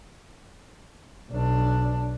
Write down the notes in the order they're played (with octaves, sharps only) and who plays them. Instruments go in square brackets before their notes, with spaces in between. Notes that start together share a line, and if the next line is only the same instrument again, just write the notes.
[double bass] B1 D4